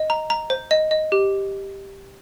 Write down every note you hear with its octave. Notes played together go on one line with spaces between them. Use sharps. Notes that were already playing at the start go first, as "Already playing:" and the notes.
Already playing: D#5
A#5
A#5
C5
D#5
D#5
G4